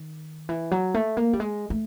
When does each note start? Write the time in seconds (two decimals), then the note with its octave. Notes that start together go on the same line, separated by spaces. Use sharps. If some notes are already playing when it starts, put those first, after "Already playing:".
Already playing: D#3
0.49 E3
0.71 F#3
0.94 A3
1.17 A#3
1.33 G3
1.40 G#3
1.70 A3